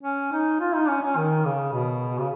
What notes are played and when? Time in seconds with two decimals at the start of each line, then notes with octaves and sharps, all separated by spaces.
0.03 C#4
0.32 D#4
0.60 F4
0.74 D#4
0.88 C#4
1.02 C#4
1.16 D#3
1.45 C#3
1.73 B2
2.20 C#3